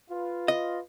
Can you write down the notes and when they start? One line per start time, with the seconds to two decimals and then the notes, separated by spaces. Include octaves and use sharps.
0.10 F4 B4
0.48 D#5